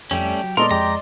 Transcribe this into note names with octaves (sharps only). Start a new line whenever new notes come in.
F2 G3 A3 C#4 G4
F#3
A#2 G#3 B3 A4 A#4 D5 D#5 C6
F2 G#3 G4 A#5 D6